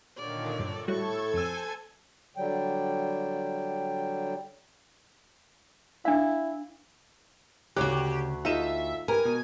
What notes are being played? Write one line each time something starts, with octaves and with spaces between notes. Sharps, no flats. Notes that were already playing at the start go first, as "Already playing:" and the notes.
A#2 D3 D#3 C#5 D5
G2 A4
A2 G3 F#4 A4 C#6 G#6
F2 C5 G#5 E6
D3 F#3 G3 G5
D4 E4 F5
D2 C#3 F#4 G4 C#5 D6 F#6
D#4 F4 A4 D#5 E5 E7
G4 A#4 B4 G#5 A#5
B2